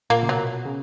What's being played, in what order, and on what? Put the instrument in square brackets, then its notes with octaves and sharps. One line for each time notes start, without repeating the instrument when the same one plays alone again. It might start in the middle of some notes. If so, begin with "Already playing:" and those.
[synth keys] A#2 [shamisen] A#3
[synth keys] C#3
[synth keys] B2 [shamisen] F#3
[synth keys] C#3